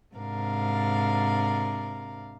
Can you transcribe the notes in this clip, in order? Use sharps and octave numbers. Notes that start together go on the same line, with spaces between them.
G#2 C3 D4 A#4 F5